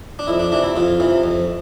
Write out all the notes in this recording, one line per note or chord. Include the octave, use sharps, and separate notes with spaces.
D4
F2 E4
D4
C3 E3 D4
E4
F2 F4
C3 E3
F2